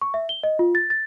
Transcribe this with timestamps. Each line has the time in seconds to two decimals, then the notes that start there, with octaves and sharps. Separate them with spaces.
0.02 C#6
0.14 E5
0.29 G7
0.43 D#5
0.59 F4
0.75 A6
0.90 A6